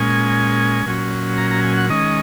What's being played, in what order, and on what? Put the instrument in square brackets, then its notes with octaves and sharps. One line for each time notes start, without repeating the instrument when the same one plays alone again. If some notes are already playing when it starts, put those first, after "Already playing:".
Already playing: [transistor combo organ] A#2 G#3 C#4 G#5
A#2 F#3 C#4
A#5
A#5
G#5
F#5
D#3 G#3 C#4 D#5